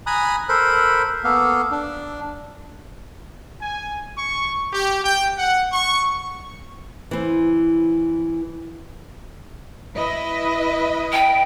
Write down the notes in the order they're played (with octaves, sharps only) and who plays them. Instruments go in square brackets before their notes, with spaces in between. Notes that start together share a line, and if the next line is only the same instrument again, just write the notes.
[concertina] G#5 A#5 B5 D#6 F#6
A4 A#4 C5 B5 F#6
A#3 B3 A4 F5
D4
[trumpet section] G#5
C#6
G4
G5
F#5
C#6
[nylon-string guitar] E3 C4
[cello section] E4 B4 D#5
[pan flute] G5